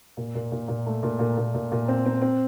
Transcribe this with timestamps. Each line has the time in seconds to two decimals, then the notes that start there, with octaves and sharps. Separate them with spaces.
0.17 A#2
0.35 A#2
0.52 A#2
0.68 A#2
0.86 A3
1.03 A#2
1.19 A#2
1.37 A#2
1.54 A#2
1.72 A#2
1.88 C4
2.06 C4
2.22 C4